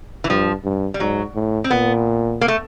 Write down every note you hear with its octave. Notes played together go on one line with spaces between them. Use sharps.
E3
G2 F3
G2
G3
G#2 F#3
A2
C4
A#2 B3
A#3
A3